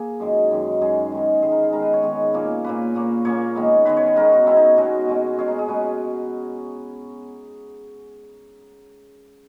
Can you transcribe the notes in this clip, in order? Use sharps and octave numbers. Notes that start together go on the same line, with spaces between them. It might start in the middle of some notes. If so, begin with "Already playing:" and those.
Already playing: A#3 G#4
F#2 D#3 G#3
F#2 D#3 G#3
F#2 D#3 G#3 G#4
D#3 G#3 B3
D#3 G#3 B3 G#4
A#4
G#4
D#3 G#3 B3 A#4
B4
C#5
D#3 G#3 B3
A#2 A#3 C#4
A#2 A#3 C#4 B4
A#2 A#3 C#4
A#2 A#3 C#4 C#5
D#3 G#3 B3
D#3 G#3 B3 B4
C#5
B4
D#3 G#3 B3 A#4
F#4
D#3 G#3 B3 E4
D#4
B2 G#3 C#4 F#4
B2 G#3 C#4
B2 G#3 C#4 G#4
A#4
G#4
B2 G#3 C#4 B4